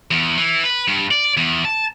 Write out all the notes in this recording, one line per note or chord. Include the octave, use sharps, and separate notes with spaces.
E2
E3
B4
G2
D5
E2
A5